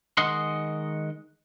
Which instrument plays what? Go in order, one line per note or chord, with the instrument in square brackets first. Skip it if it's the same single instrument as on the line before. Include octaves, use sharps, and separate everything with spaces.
[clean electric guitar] D#3 G#3 D#5 F#5 C6